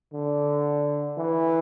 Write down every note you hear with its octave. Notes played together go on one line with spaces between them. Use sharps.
D3
E3